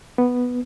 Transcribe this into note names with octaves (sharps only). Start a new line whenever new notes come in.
B3